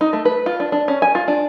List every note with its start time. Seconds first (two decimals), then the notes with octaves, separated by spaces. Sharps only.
0.01 D#4
0.13 A3
0.25 B4
0.46 F4
0.60 D4
0.72 D4
0.88 C#4
1.02 G#5
1.15 F4
1.28 D4